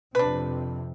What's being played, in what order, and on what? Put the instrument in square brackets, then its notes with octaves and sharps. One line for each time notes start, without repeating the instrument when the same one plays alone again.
[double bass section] F2 C3 [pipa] D4 B4